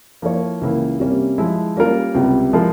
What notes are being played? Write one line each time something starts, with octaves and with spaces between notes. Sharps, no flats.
F3 A#3 E4 A#4 C#5
C#2 C#3 E3 A#3 E4
C3 G3 A#3 C#4
F3 G#3 E4
G3 A#3 C#4 F4 A#4
C#2 C3 G3
F3 G#3 E4 A#4